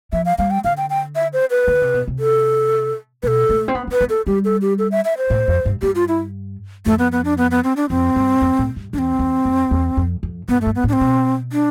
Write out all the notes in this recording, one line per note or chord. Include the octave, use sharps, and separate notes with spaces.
F3 E5
F5
G3 F5
G5
D3 F5
G5
G5
E5
C5
B4
D3
C3
B2
C3
A4
B2 A4 B4
A3
C4
B3
C4
B4
B3
A4
G3 G4
A4
G4
A4
E5
E5
C5
A2
F2
G2
G2 G4
F4
E4
F2 A3
B3
B3
D4
B3
B3
C4
D4
F2 C4
G2
F2
A2
G2
E2 D4
C4
E2
F2
E2
F2
F2
G2 B3
A3
G2
B3
A2 D4
C4
B2
D4